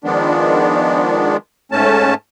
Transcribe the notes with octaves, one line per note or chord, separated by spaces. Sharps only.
D#3 F3 G#3 B3 D4
G#2 A3 C#4 A5